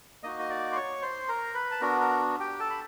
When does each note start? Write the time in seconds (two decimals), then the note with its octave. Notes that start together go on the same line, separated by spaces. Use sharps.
0.23 A#3 D#4 F#4 D#5 D#6
0.39 D#6
0.50 D5 D6
0.72 C6
0.75 C#5 C#6
1.02 C5 C6
1.28 A#4 A#5
1.54 B4 B5
1.71 A5
1.81 B3 D4 F#4 A#4 A#5
2.01 A#4 A#5
2.40 G4 G5
2.60 A4 A5
2.70 B5